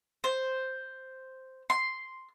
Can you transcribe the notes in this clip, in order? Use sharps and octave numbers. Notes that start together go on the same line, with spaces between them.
C5
C6